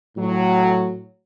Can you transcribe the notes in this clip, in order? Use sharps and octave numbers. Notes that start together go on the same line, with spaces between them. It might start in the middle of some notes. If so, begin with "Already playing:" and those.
A2 F#3